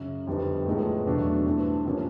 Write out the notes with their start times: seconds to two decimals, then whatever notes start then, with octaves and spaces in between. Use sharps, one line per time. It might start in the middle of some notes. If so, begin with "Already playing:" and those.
Already playing: F#2 C#3 F#3
0.27 F2 D3 G3 B3 D#4
0.66 A2 F3 G#3 B3 D#4
1.06 E2 B2 F#3 A3 D4
1.45 G2 E3 A3 C4
1.85 C3 F3 A#3 C#4